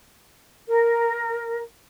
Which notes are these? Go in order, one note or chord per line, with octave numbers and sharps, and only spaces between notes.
A#4